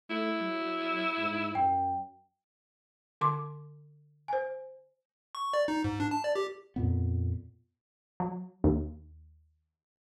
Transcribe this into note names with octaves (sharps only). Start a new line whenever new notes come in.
A3 E4
F#3
G#2
F#2 G5
D3 C6 D6
C5 G#5
C#6
D5
D#4
G#2
D4
A5
D5
G4
F2 A#2 B3
F#3
D#2